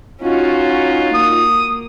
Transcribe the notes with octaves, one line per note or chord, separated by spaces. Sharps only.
C#4 D#4 F4 F#4
A#3 D#6